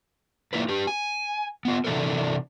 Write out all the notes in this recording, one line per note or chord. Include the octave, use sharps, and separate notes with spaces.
A#3 E4 F4 B4
G4 B4
G#5
B3 F4
C3 E3 C4 D4 A4 A#4